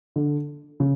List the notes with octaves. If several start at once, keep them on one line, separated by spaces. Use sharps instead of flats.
D3
C#3